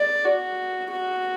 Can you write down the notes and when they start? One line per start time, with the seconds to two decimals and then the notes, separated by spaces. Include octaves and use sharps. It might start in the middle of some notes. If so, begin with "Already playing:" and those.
Already playing: D5
0.25 F#4
0.90 F#4